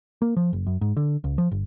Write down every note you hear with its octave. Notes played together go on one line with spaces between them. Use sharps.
A#3
F3
F#1
F#2
G#2
D3
C#2
F3
G1